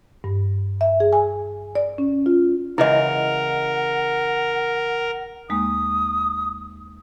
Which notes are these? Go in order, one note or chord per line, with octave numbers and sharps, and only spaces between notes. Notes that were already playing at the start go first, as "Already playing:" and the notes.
G2
E5
G#4
G#5
D5
C#4
F4
C#3 E3 G#3 E4 A#4 D#5 F#5
D#2 G#3 A#3 D#6